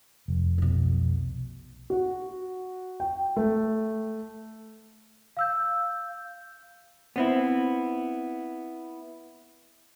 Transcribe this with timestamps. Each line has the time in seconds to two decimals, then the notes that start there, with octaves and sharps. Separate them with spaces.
0.28 F1
0.58 B1 B2
1.90 F#4
3.00 G5
3.37 A3
5.37 F5 E6 G6
7.16 B3 C4 E4